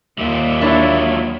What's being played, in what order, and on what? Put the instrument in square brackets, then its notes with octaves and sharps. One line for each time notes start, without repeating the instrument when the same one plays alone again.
[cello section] D#2 E5 [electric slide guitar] G3 A#3 F4
[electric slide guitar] F#3 F4 [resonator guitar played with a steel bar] D4 E4 C#5